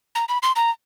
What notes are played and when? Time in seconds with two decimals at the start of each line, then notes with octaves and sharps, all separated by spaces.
0.15 A#5
0.29 B5
0.43 C6
0.56 A#5